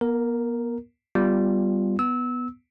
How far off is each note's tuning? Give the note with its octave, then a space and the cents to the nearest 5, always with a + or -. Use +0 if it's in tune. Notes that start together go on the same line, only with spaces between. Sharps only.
B3 -45 A#4 +0
G3 +0 B3 +0 F4 +0
B3 +0 E6 -25